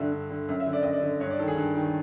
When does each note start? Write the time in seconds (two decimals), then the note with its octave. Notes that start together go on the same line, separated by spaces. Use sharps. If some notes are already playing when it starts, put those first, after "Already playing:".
Already playing: G2 D3 E5
0.12 G2
0.30 D3
0.48 F#2
0.60 E5
0.66 D3
0.73 D5
0.83 F#2 D#5
0.93 D5
1.02 D3
1.20 G2 C#5
1.30 D5
1.39 D#3 A4
1.48 G#4
1.56 G2
1.75 D#3